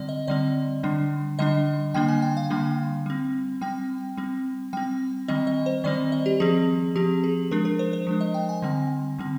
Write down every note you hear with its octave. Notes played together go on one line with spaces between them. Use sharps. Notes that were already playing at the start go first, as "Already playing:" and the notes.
Already playing: D3 G3 C4 D5
D#5
D3 G3 C4 D5
D3 G3 D4
D3 G3 D4 D#5
D3 G3 A#3 D4 G5
G#5
G5
F5
D3 G3 A#3 D4
G3 C4
G3 C4 G5
G3 C4
G3 C4 G5
D#3 G3 C4 D#5
D#5
C5
D#3 G3 C4 D5
D#5
G4
F3 C4 G#4
F3 C4 G4
G#4
F3 G#3 D4 A#4
A#4
C5
C5
F3 G#3 D4
D#5
G5
G#5
D3 G3 C4
D3 G3 C4